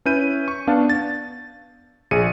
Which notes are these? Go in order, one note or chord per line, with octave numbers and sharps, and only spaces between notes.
C#4 E4 B4 G6 D#7
C#6
B3 D4 F5 A5
A6
A#1 G#4 G#5 C#7 D#7